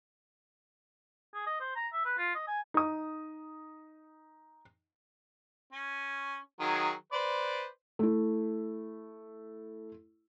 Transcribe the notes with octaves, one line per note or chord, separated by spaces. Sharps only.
G#4
D#5
C5
A#5
E5
B4
F4
D#5
G#5
D#4 D#6
C#4
D#3 F#3 G#4
B4 C5 D5
A3 E4